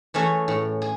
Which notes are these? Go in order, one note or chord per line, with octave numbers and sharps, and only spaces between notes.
E3 A3 C#4 G#4
A2
G#4